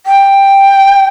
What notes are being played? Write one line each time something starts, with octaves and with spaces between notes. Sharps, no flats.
G5